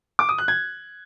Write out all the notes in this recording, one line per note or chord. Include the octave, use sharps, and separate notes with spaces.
D6
D#6
F#6
G#6